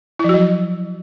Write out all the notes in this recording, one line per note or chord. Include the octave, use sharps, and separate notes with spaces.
F3 F#3 E4 F#4